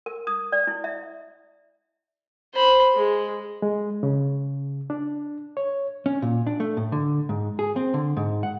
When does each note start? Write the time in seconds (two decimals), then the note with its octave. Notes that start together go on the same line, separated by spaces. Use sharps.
0.06 A#4
0.27 D#6
0.52 D5
0.67 E4
0.84 E5
2.54 C5 B5
2.94 G#3
3.62 G#3
4.03 C#3
4.90 D4
5.57 C#5
6.06 C#4
6.22 A#2
6.47 D4
6.60 A3
6.77 A2
6.92 D3
7.29 G#2
7.59 G#4
7.76 C4
7.94 D3
8.17 G#2
8.43 F#5